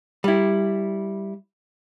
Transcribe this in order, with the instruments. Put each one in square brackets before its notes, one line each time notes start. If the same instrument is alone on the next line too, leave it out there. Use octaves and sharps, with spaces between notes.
[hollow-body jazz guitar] G3 E4